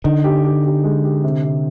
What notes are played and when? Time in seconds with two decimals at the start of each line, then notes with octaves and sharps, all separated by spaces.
0.04 D3 D#4
0.24 G4
0.44 G4
0.65 G4
0.84 G#3
1.04 G4
1.23 C3
1.43 C3